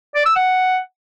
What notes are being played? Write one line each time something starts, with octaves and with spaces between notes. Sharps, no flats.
D5
E6
F#5